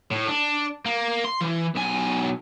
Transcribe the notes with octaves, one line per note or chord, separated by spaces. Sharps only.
A2
D4
A#3
C6
E3
B1 G#5